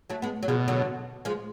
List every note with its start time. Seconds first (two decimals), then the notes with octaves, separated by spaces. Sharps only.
0.10 F#3 A3
0.22 G#3 B3
0.43 F#3
0.48 B2 F3 G#3
0.68 D3 F#3
1.25 F3 G#3